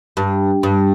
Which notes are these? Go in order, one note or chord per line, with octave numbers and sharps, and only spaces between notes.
G2
G2